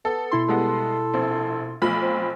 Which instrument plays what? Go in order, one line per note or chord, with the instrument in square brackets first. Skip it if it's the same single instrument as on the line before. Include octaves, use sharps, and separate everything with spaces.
[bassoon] B3 [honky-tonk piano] A4
[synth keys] B2 E4 C6
[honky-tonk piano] G3 G#3 B3 [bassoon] A4
[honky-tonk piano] A#1 C4
[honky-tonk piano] B1 F3 B5 [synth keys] A3
[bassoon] C4